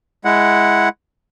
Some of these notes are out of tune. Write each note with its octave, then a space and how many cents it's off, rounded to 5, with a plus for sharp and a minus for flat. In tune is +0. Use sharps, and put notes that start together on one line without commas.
G#3 +0 E4 +0 F#5 +0